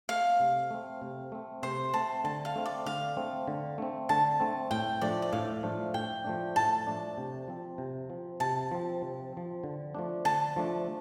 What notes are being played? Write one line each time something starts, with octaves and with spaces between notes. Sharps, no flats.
A3 C4 F5
C3
A3 C4
C3
A3 C4
C3 C5
A3 C4 A5
D3 A5
F5
A3 C4
D5
D3 F5
A3 C4
D3
A3 C4
D3 A5
A3 C4
A2 G5
F3 A3 D4 D5
D5
A2 F5
F3 A3 D4
A2 G5
F3 A3 D4
A2 A5
F3 A3 D4
C3
F3 C4
C3
F3 C4
C3 A5
F3 C4
C3
F3 C4
D3
F3 A3 D4
D3 A5
F3 A3 D4